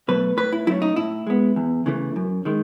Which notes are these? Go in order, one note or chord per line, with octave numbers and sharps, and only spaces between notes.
B2 F#3 A3 B4
A2 B4
E4
F#3 A3 C#4 E4
D#4
A2 E4
G#3 B3
E2
C#3 E3 A3
F#2
D#3 G#3